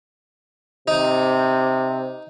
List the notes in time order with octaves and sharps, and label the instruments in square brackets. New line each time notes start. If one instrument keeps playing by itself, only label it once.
[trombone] C3 [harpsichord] D#4